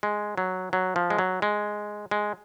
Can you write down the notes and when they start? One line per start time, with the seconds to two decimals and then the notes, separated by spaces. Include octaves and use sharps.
0.03 G#3
0.38 F#3
0.73 F#3
0.96 F3
1.10 G#3
1.18 F#3
1.42 G#3
2.11 G#3